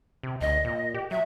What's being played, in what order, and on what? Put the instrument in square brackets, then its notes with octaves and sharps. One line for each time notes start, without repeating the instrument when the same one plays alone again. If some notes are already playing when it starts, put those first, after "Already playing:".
[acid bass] C3
[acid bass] D2 [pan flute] D#5
[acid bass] A#2
G4
[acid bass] F#3 [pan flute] E5